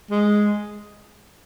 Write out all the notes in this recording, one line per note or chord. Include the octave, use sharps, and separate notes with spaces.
G#3